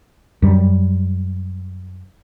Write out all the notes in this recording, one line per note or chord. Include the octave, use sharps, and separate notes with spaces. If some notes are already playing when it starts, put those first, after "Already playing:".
F#2 G3